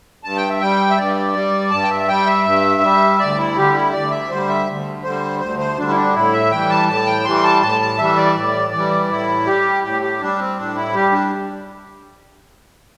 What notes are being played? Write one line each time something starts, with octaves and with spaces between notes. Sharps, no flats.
G2 A5
G5
E5
G3 G5
E5
G2 D5
G3
G2 A5
G5
E5
G3 G5
E5
G2
G3
D2 D5
E4
D3 G3 G4
E4
D2 D5
E5
D3 G3 C5
E5
D2
D3 G3 C5
D2 C5
C5
D3 G3 D4
E4
D4
A2 E4
E5
E3 G3 G5
A5
A2 A5
G5
E3 G3 C6
A5
A2 A5
A5
E3 G3 E5
D5
A2
E3 G3
A2 E4
G3 G4
A2 G4
G4
G3 D4
C4
A2 D4
E4
G3 G4
D4